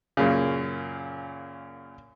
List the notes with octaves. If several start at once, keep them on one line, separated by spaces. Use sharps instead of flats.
F#2 A#2 C#3